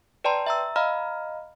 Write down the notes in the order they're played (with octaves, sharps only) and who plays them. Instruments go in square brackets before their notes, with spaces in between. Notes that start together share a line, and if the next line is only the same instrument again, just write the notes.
[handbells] B4 D5 G5 A5 A#5 C6
E5 A#5 E6
D#5 F5 A#5 B5 F6